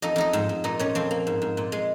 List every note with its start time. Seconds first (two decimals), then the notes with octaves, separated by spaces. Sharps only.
0.02 F2 D#4 D#5
0.16 F2 D#4 D#5
0.33 G#2
0.49 G#2
0.64 A#2 D#4 D#5
0.79 A#2 C#4 C#5
0.95 F2 C4 C5
1.11 A#3
1.27 G#2
1.42 G#2
1.57 A#2
1.72 G#3